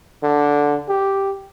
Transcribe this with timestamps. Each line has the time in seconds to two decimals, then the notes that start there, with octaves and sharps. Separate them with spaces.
0.23 D3
0.89 G4